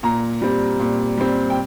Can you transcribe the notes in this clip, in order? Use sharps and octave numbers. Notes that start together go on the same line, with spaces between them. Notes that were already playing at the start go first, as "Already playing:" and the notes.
A#2 A#5
G3 C4
A#2
G3 C4
G5